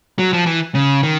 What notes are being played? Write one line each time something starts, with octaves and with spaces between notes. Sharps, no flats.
F#3
F3
E3
C#3
D#3